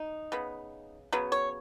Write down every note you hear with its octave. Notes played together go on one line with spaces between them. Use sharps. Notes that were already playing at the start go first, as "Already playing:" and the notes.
Already playing: D#4
C#3 B3
C#3 F#3 B3
C#5